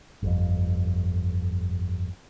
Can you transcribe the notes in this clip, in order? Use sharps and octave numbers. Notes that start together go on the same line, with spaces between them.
G1 F2